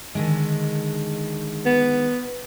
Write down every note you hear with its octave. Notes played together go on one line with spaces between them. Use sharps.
D3 D#3 G#3
B3